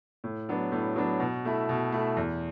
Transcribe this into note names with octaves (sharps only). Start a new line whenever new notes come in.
A2
F#3 B3 D4
A2
F#3 B3 D4
B2
A3 E4
B2
A3 E4
E2